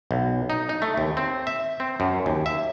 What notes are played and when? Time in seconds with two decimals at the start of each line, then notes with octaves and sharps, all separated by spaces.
0.11 B1
0.50 D#4
0.69 D#4
0.82 A3
0.97 D#2
1.17 C4
1.47 E5
1.80 C4
2.00 F#2
2.26 D#2
2.46 E5